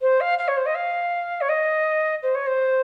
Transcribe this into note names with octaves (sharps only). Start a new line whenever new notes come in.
C5
F5
F5
C#5
C5
D#5
F5
C#5
D#5
C5
C#5
C5